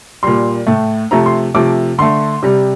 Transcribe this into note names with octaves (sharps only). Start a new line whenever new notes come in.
A#2 G3 C6
A2 A3
C3 F3 A3 A#5
C6
C3 F3 A3 D6
D3 A3 C6
C3 G3